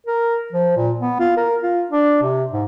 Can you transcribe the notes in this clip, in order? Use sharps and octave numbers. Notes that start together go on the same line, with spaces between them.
A#4
F3
A#2
B3
F4
A#4
F4
D4
C3
G#2